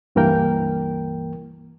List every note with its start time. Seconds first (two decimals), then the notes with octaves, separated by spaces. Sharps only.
0.15 C#2 G2 E3 A#3 A#4 G5